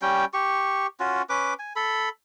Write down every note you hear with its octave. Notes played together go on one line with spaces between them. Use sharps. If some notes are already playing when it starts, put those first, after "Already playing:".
G3 C#4 G5
G4 C#6
C#4 F4 F#4
C#4 B4 D6
G#5
A4 B5